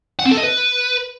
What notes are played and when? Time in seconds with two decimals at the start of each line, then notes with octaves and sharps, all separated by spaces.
0.19 F#5
0.25 C4
0.31 A4
0.37 D#5
0.43 B4